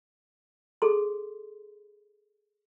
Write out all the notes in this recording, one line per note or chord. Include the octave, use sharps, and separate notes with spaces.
G#4 A4 C6